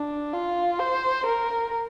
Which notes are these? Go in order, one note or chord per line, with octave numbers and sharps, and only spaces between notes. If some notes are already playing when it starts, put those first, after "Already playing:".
Already playing: D4
F4
C5
A#4